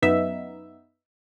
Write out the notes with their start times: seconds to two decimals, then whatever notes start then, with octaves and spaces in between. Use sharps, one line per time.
0.02 F#2 B3 D#4 E5